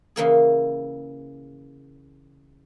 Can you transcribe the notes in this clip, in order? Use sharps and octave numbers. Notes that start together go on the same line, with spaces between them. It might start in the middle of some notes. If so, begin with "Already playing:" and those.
C#3 E3 A#3 G#4